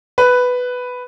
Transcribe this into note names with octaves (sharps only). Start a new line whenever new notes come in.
B4